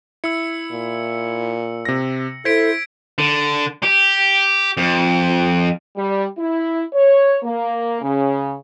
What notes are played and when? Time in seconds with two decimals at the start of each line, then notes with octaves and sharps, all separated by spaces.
0.24 E4 E6 C#7
0.72 A#2
1.85 C3 A#6
2.45 E4 A4 C5 G#6 B6 D7
3.18 D3
3.83 G4
4.77 F2
5.96 G3
6.38 E4
6.93 C#5
7.43 A#3
8.01 C#3